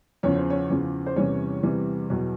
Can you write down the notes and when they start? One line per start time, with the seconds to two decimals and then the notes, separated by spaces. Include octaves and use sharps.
0.23 E2 C#3 F3 C#5
0.37 C5
0.50 C#4 C#5
0.70 E2 C#3 F3
1.06 C5
1.16 E2 C3 E3 G3 C#4 C#5
1.63 E2 C3 E3 G3
2.10 E2 B2 F#3